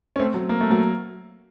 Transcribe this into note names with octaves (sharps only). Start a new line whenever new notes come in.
C#4
A3 C4
F#3
A#3
A3
F#3 A#3